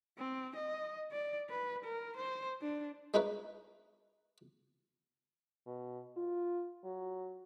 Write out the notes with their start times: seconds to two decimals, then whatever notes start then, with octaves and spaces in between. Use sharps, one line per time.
0.18 C4
0.56 D#5
1.12 D5
1.50 B4
1.84 A#4
2.16 C5
2.62 D4
3.14 G#3 D#4 E4 A#4 B4 C#5
5.67 B2
6.17 F4
6.84 F#3